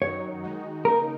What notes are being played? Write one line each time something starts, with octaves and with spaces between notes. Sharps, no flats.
F#2 D#3 F#3 D#4 C#5
D#3 G#3 D#4 F#4
C#3 A#3 D#4 A#4